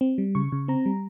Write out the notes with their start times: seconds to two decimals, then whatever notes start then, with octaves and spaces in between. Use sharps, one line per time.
0.01 C4
0.18 G3
0.35 C#3 C#6
0.52 C#3
0.68 C4 A#5
0.86 G3